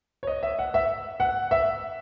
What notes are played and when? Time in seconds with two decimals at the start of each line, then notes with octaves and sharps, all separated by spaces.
0.23 C#5
0.27 D#5
0.43 E5
0.59 F#5
0.74 E5
1.20 F#5
1.51 E5